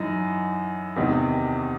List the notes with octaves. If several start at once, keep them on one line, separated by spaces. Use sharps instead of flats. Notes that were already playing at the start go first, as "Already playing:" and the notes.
Already playing: F#2 E3 D#4 E4
E2 C3 D#3